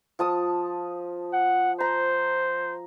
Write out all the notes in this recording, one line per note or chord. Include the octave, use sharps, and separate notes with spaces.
F3 A5 D#6
F#5
C5 A#5